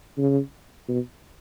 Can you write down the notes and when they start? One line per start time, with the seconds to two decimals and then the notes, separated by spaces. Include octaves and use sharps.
0.18 C#3
0.89 B2